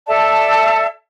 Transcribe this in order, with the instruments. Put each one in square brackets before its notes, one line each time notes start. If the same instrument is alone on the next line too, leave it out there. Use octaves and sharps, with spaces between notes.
[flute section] A4 D5 E5 A5